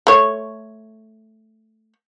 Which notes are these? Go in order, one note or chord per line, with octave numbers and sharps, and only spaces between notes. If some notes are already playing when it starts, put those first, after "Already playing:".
A3 C#5